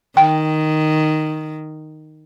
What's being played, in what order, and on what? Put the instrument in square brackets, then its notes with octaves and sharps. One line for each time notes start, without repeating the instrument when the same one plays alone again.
[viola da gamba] D#3 [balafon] G5